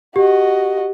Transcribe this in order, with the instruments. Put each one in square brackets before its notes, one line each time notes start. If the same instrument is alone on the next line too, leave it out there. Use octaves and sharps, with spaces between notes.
[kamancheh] F#4 D#5 [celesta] G4